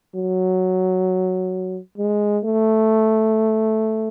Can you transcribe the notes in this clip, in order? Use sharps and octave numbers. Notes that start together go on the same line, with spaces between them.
F#3
G#3
A3